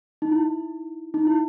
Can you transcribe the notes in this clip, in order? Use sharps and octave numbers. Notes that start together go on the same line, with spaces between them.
D#4
E4
D#4
E4